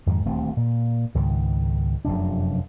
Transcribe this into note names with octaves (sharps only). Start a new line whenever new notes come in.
F2 G#2 D#3
D#1 D2 A3 C4
A#2
C#2 G#2 D#3
F1 F#2 C3 D4